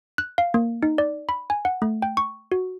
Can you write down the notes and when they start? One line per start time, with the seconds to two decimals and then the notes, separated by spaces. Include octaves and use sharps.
0.18 F#6
0.38 F5
0.54 A#3
0.83 D#4
0.98 D5
1.29 B5
1.50 G#5
1.65 F#5
1.82 A3
2.02 G5
2.17 C#6
2.52 F#4